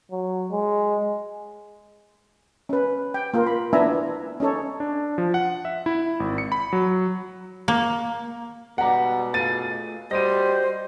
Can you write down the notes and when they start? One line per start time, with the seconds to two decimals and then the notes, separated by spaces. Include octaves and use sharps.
0.12 F#3
0.51 G#3
2.69 C#4 B4
3.14 G5
3.34 A#3 F4 A#4
3.46 B5
3.73 B3 D4 E4 E5 G#5 A#5
4.40 C#4 D#4 A4 C#5
4.80 D4
5.18 F3
5.34 F#5
5.65 E5
5.86 E4
6.20 G#1
6.38 C#7
6.52 B5
6.73 F#3
7.68 A#3
8.78 G#2 B2 G3 D5 F#5 A#5
9.34 A3 F4 G#4 A6 D#7
10.11 G3 F#4 G4 C5 D#5 A#6 D#7